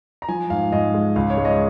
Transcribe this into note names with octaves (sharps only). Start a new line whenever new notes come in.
A#5
F3 G#5
G#2 F5
G#2 D#5
G#3
C#2 F5
C#5
G#3
D#5